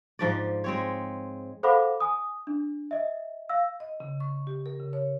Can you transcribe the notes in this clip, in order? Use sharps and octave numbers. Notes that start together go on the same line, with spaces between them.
G#2 F3 D5
G#3 C4 C#5
A4 C5 F5 F#5 B5 D6
G#5 D#6
D4
D#5 E5
F5 E6
D#5
C#3
C#6
G4
A#4
C#3
C#5